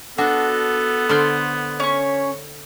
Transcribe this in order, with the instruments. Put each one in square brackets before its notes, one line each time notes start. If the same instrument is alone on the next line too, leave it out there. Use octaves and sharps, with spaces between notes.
[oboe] B3 [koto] D4 [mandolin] F#4 [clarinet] A4
[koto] D3 C5 D5 [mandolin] C6 F6
[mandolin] C#4 C#6 [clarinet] C#5